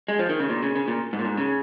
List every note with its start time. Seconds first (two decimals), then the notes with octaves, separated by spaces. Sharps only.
0.08 G#3
0.19 F3
0.29 D#3
0.40 C#3
0.49 A#2
0.62 C#3
0.75 C#3
0.88 A#2
1.13 G#2
1.19 A#2
1.25 G#2
1.38 C#3